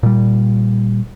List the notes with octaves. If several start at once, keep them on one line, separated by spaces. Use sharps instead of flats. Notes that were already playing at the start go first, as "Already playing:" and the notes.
A#2 G3